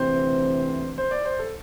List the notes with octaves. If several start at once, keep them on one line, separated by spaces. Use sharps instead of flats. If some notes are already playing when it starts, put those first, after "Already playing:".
Already playing: D2 C3 E3 C4 C5
C5
D5
C5
A4